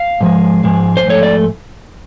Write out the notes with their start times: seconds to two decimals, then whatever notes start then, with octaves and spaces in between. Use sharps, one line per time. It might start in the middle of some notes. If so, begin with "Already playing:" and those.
Already playing: F5
0.21 G#2 F3 G#3
0.64 G#2 F3 G#3
0.97 C5
1.06 G#2 F3 A3 C#5
1.23 D5